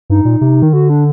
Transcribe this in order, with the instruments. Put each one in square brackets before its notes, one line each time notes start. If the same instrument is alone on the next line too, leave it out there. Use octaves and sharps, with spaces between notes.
[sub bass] G2 [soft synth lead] D#4
[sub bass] A#2
C3
D#3
[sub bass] D3 [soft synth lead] F#4
[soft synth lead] D4